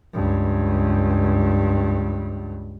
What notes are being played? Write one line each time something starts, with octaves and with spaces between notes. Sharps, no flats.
C#2 G2